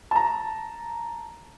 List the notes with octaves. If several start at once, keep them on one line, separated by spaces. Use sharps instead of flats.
A5 A#5